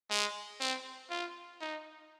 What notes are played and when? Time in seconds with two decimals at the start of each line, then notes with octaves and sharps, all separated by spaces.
0.10 G#3
0.60 C4
1.10 F4
1.61 D#4